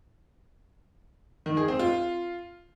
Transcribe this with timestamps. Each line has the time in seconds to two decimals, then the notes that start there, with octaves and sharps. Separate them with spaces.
1.46 D#3
1.57 G#4
1.68 C4
1.79 F4